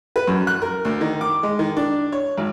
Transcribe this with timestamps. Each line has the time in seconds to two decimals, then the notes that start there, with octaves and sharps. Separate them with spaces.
0.16 B4
0.27 F#2
0.47 F#6
0.62 A#4
0.85 D2
1.01 D#3
1.21 D6
1.43 G#3
1.59 D#3
1.77 D4
2.12 C#5
2.37 G#1